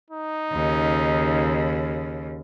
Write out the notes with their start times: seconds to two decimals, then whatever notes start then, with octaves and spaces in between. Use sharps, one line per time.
0.11 D#4
0.52 D#2 C#3